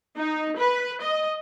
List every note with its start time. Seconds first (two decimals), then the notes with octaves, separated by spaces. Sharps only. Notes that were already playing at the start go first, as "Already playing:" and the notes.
0.16 D#4
0.59 B4
1.02 D#5